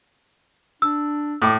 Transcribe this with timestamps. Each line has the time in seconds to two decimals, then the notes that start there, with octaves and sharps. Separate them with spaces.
0.82 D4 E6
1.42 A2 D6